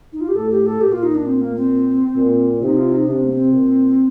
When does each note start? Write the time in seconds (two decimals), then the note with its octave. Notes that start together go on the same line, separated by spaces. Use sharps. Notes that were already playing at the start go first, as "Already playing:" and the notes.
0.13 D#4
0.21 F4
0.28 G4
0.36 A2 A4
0.50 G4
0.66 A4
0.81 A#2 G4
0.92 F4
1.03 D#4
1.14 D4
1.26 C4
1.41 A#3
1.56 C4
2.16 A#2
2.61 C3 D#4
2.77 F4
2.92 D#4
3.07 C3 D4
3.23 A#3
3.30 C4
3.52 A#2